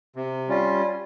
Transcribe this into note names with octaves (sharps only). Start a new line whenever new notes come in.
C3
G3 C#4 F4